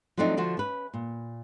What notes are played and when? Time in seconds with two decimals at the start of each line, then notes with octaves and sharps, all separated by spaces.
0.17 F3 F#3 A3 C4 D4 D#4
0.37 D3 F3 F#4
0.57 C#4 B4
0.94 A#2